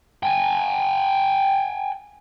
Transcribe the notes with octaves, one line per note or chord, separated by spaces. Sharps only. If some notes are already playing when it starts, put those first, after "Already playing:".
G5 G#5